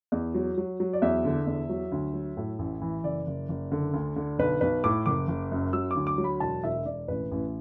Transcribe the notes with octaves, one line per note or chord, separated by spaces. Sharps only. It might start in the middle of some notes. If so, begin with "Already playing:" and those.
E2
F#3
F#3
F#3
D5
E2 E5
D3
E2
F#3
D2
F#3
A2
A1
E3
F#1 D5
F#1
F#1
D3
D2
D3
B1 B4
B1 B4
A2 D6
F#1 D6
F#1
F#2
F#3 E6
D2 D6
D6
F#3
B5
E1 A5
E1 E5
E1 D5
A1 B4
A1